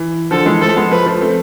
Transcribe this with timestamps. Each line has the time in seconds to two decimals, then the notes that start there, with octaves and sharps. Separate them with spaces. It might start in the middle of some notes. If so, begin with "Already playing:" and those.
Already playing: E3
0.31 D3 F3 A4
0.46 E3 G#3
0.61 F3 A3 A4
0.77 G#3 B3
0.91 F3 A3 B4
1.06 F3 A3
1.21 A3 C4